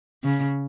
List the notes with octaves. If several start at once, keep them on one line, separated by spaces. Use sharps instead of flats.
C#3